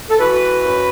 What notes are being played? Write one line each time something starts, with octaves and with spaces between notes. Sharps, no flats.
A4
E3 F#4 B4
F#2